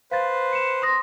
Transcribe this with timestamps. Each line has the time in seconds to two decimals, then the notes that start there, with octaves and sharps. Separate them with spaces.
0.11 B4 C5 F5 A6
0.53 C#7 E7
0.82 C6 D#6 A#6